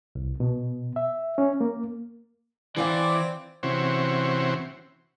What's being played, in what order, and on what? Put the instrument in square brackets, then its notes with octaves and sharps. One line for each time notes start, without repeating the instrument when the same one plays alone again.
[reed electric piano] C2
B2
E5
C#4
A#3
[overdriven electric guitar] E3 [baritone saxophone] C4 [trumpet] D5 [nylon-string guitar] F5 F#5 G#5
[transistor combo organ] C3 E3 C4 C#4 F#4